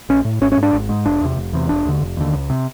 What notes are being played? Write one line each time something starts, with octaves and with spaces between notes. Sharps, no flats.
A#1 C#4
A2
G#1 C#4
C#4
G#2
D4
G#1
G#2
F1 D4
E2 C3
F1
E2 C3
F1 D4
D#2 D3
F1
D#2 D3
C#2
C3